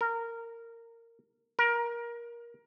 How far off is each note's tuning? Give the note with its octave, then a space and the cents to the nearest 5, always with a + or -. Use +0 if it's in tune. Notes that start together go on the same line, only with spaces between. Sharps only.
A#4 -15
A#4 +20